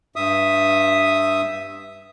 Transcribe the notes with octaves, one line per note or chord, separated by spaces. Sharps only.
G2 E5 D#6